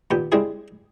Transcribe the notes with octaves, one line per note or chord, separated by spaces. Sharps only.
D#2 A#2 B3 G4
G3 G#3 C4 D4 E4 G#4